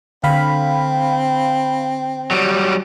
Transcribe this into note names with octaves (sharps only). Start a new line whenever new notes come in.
D3 C4 F5 B5
F#3 G3